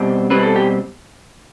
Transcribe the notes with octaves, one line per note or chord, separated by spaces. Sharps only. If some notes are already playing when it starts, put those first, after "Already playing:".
Already playing: B2 G3 C4
B2 G3 C4 B4
A4
G4